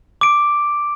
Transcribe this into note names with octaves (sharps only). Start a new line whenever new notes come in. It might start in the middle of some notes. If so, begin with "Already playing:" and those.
D6 D7